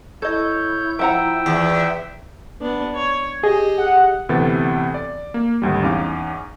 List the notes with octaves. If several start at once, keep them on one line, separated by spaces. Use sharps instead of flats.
E4 A4 C#5 D#5 G6
F3 E5 F#5 G5 A#5
E2
B3 D4
C#5
G4 G#4 D#5
F#5
D2 C3 E3 B3 A4 A6
D5
A#3
G#1 D2 G3
E2 C#4 D#4 F5 D6